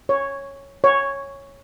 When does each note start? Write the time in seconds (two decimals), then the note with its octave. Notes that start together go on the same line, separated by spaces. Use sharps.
0.09 C#5
0.84 C#5